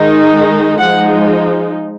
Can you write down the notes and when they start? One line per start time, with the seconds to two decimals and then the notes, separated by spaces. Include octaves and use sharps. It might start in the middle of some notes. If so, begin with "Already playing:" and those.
Already playing: D#3 G#3 D#4
0.80 F3 G#3 D#4 F#5